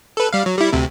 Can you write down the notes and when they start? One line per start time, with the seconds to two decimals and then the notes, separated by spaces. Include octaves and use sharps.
0.17 A4 B4
0.33 G3 F5
0.46 F#3
0.58 G3 E4
0.73 D2 C3